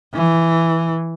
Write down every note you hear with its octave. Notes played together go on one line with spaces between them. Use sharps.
E3